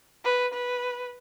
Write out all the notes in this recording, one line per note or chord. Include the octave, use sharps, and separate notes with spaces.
B4
B4